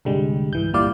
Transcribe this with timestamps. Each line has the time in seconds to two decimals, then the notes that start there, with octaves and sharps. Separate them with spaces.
0.05 C2 G#2 D3 G3 G#3
0.53 G2 E3 G6
0.73 G1 A#2 G3 E4 D5 F5